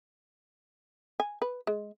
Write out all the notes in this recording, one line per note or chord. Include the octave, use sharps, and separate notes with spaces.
G#5
B4
G#3